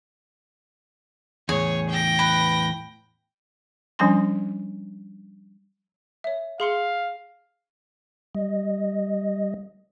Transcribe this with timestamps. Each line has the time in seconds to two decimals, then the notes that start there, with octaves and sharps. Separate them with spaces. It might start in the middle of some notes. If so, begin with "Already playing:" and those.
1.49 E2 A2 G#4 C#5
1.90 G5 A#6
2.19 B4
3.99 F3 G3 C#4 D4 G#5 C6
6.24 C#5 E5
6.60 G#4 F5 C6 C#7
8.35 G3 D#5